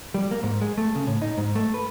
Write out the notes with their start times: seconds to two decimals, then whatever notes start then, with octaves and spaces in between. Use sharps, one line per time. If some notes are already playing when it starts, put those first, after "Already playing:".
0.14 G3
0.31 A#3
0.43 G#2
0.61 G#3
0.78 A3
0.95 C#3
1.07 A2
1.22 D#4
1.37 G#2
1.55 A3
1.74 B4